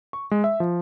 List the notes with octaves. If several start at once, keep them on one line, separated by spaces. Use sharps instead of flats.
C#6
G#3
E5
F3